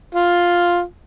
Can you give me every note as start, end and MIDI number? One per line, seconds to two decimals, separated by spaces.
0.15 0.81 65